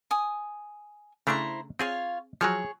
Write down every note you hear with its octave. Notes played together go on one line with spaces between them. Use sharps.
G#5 D#6
C#3 A3 D4 E4 C5 A#5
C4 F4 G#4 C#5 F5
F3 F#3 G#4 C#5